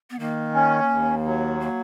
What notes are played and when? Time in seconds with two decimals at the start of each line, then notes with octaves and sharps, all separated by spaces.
0.10 B3
0.19 D#3 A#3
0.54 C#4
0.90 D#2
1.25 F#3
1.60 A#3